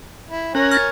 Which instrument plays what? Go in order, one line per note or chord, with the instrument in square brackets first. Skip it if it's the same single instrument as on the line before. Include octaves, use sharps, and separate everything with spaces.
[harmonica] E4
[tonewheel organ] C#4 F#6 A#6 [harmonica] A#4 C#5 G#5
[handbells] F6 G#6 A6